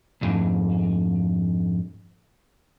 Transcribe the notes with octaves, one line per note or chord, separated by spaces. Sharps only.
C2 F2 G#2